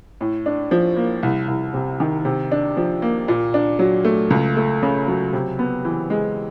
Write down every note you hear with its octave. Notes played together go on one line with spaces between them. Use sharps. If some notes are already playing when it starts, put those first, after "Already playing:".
A2
D4
F3
A#3
C2
C2
C3
D#3
C3
D4
F3
A#3
A#2
D4
F#3
A3
C#2
A3
C#3
F#3
C3
B3
E3
G#3